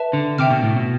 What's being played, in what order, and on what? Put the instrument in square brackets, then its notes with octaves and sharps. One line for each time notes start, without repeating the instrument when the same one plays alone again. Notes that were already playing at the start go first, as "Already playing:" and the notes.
Already playing: [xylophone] B4 E5 A5
[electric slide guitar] D3
[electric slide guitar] C3 [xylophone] E5 G5 D6 F6
[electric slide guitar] B2
A2
B2